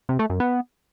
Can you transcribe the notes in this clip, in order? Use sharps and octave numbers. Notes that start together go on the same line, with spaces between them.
C3
A3
F#2
B3